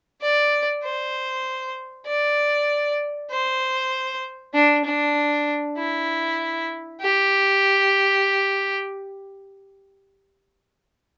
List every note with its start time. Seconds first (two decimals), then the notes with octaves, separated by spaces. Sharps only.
0.21 D5
0.83 C5
2.07 D5
3.31 C5
4.54 D4
4.85 D4
5.77 E4
7.02 G4